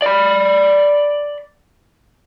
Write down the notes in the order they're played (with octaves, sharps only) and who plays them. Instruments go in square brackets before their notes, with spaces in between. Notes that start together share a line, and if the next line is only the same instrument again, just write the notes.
[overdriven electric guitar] D5 B5